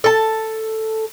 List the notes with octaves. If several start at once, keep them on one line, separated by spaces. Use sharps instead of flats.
A4 A5